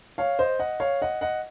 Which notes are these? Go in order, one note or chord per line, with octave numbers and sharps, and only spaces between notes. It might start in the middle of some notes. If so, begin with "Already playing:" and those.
C#5 F5
C5 D#5
D#5 F#5
C#5 F5
D#5 F#5
D#5 F#5